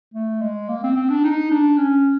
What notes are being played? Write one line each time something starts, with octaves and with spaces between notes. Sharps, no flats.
A3
G#3
A#3
C4
C4
D4
D#4
D4
C#4